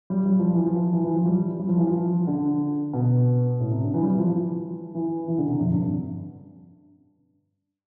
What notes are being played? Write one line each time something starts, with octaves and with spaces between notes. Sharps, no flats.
G3
G3
F3
E3
F3
E3
E3
F3
G3
G3
F3
E3
F3
D3
B2
A2
C3
D3
E3
G3
F3
E3
E3
E3
D3
C3
F2
G2